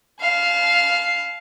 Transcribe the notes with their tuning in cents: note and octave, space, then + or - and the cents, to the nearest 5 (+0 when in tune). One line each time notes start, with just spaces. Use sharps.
F5 +0 A5 -35